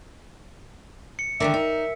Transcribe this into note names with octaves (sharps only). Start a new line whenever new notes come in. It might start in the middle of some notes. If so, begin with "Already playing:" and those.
C#7
D3 D#3 D4 A#4 D5 E5
D#4